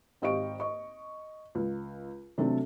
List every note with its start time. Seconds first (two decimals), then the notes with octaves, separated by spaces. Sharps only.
0.22 G#1 G4 D#5 F5 C#6 D7
0.60 D#5 C#6
1.55 C#2
2.38 C3 F#3 A3 C4 D4 A4